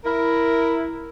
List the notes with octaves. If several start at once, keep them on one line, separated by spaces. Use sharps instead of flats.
E4 A#4